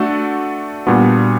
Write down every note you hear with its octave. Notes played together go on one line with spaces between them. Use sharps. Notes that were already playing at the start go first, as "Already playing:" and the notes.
Already playing: A3 D4 F#4 A4
A#2 G3 B3 D4 F#4